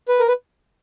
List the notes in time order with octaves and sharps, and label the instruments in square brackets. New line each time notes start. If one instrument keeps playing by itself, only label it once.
[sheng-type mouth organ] B4
A#4
B4